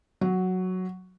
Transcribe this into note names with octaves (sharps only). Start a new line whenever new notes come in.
F#3